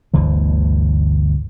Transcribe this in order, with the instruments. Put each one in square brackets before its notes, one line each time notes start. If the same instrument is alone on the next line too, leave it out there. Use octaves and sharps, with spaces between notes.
[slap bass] G1 D2 D3 E3